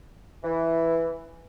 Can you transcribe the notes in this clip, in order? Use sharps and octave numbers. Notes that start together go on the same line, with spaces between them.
E3